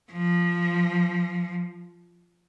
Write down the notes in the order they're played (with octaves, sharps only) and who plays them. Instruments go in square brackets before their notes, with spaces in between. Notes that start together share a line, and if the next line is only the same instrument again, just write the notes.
[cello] F3